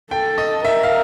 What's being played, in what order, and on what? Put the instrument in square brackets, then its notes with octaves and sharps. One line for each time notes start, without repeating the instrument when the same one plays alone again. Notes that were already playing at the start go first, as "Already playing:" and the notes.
[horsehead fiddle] A4 [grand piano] G5
[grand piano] D#5
[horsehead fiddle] A#4 [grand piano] E5
[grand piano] F5